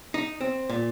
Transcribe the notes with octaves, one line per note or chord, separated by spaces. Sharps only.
D#4
C4
A#2